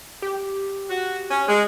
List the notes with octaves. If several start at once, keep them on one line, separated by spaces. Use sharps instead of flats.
G4
F#4
C#4
G#3